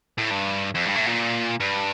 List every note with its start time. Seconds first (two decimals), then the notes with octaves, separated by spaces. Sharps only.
0.18 A2
0.31 G2
0.75 F2
0.85 G2
0.95 A2
1.06 A#2
1.60 G2